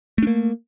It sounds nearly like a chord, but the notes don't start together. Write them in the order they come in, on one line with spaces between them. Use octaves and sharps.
A3 D4 A#3